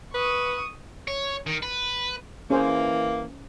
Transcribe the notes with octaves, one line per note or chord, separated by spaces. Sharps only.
B4 C#6 D#6
C#5
D#3
B4
E3 A#3 C#4 G#4 C5